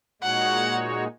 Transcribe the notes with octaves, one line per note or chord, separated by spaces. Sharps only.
A#2 G#3 D#4 F#4 C#5 F#5